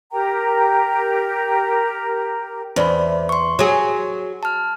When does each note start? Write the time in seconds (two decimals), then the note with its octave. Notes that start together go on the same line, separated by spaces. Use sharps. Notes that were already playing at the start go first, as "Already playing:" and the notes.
0.11 G4 A#4 G5 A#5
2.76 E2 C5 D5 B5
3.29 C6 C#6
3.59 F#3 G#4
4.43 A5 F6